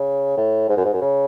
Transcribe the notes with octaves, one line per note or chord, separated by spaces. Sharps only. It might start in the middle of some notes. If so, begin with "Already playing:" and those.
Already playing: C#3
A2
G#2
F#2
G#2
F#2
C#3